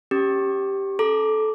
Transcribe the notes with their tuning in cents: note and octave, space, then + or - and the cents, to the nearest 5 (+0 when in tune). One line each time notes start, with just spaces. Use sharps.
C#4 -5 G4 +0 D6 +0
A4 -20 A#5 +0 D6 +0